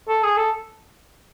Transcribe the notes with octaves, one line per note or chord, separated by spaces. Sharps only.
A4
G#4
A4